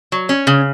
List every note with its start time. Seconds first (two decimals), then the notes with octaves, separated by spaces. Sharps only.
0.12 F#3
0.29 C#4
0.47 C#3